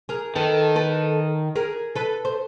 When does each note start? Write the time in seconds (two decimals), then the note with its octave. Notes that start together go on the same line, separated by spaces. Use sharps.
0.09 G#4 A#4
0.36 D#3 A4 B4
0.76 A4 B4
1.56 G#4 A#4
1.95 A4 B4
2.25 C5